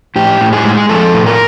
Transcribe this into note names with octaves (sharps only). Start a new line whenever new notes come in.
A2 G4
A2
G#4
G#3
F3 A4
A2
A#4